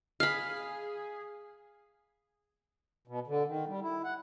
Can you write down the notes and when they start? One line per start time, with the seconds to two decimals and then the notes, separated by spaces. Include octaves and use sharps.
0.20 G#4 F5 B5 F6
3.08 B2
3.27 D3
3.48 D#3
3.68 G3
3.82 E4
4.04 F#5